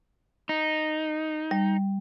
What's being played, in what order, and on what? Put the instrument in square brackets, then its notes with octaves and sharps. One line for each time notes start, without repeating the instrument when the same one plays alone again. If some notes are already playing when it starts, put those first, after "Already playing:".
[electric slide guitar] D#4
[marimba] G3